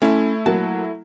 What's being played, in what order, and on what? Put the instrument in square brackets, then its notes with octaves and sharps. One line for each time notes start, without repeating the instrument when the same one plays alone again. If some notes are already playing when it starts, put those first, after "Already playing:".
[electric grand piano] A3 E4 [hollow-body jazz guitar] C#4 E5
[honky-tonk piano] F#3 A#3 [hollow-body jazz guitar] A5